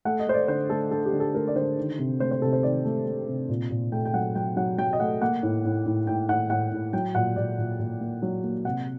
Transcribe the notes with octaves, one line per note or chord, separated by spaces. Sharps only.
A3 F#5
D#5
A3 C5
D5
D3 C5
A3 A4
D3 A4
G4
D3
A4
A3 A#4
D5
D3 C5
D#3
C3
A3 C5
C5
C3 A4
C5
D#3 D5
A3
A3
C3
A#2
A#2
A3 G5
G5
F#3 F#5
F#3 G5
F#3 F#5
F#3 G5
D#5
A3 F#5
A#3 F#5
A2
A2
A2
A2 G5
A2 F#5
A2 F#5
A2
F#3 G5
A#2 F#5
A#2 D5
A#2
A#2
A#3
F#3
A#3
C3 F#5